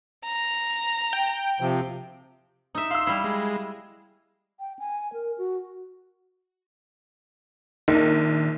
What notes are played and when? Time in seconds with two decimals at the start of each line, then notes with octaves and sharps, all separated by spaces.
0.24 A#5
1.13 G5
1.61 C3 F3
2.75 D#4 E5
2.91 F5 C6 E6
3.07 G3 E4
3.24 G#3
4.59 G5
4.79 G#5
5.13 A#4
5.38 F#4
7.88 A#1 D#3